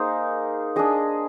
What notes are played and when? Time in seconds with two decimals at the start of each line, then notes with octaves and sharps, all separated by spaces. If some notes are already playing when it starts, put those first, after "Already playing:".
Already playing: A#3 D#4 G#4 C5
0.76 D4 G#4 D#5